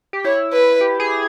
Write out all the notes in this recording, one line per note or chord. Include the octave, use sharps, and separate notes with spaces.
G4
E4 C#5
B4
G4
G#4